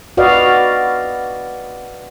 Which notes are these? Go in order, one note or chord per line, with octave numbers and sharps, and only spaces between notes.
F#4 B4 D5 D#5 F5